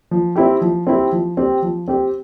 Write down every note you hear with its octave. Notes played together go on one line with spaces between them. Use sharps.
F3
C4 E4 G4
F3
C4 E4 G4
F3
C4 G4
F3
C4 G4